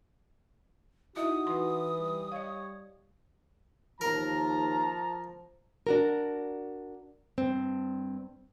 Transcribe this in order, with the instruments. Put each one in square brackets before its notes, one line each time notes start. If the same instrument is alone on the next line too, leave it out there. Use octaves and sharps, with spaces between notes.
[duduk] D#4 [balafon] E4 D#5 E5 [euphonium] F#4 [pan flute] D#6
[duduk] E3 [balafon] D#4 C6
[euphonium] G3
[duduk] C#5 [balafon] D#5 F5
[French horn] D#2 [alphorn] F3 [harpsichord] A#4 [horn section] F5 A5 A#5
[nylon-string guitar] D4 F#4 A#4
G2 C4